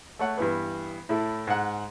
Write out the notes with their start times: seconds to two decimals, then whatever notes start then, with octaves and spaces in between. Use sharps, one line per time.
0.19 A3 C#5 F#5
0.37 G2 E3 B3
1.09 A2 E4 A4
1.47 G#2 F#5